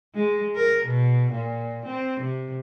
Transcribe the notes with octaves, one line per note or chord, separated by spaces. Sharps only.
G#3
A#4
B2
A#2
C4
C3